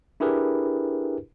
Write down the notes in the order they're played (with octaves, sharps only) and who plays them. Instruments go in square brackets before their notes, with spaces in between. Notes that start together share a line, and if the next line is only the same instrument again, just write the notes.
[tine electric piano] D4 E4 G4 G#4 A#4 B4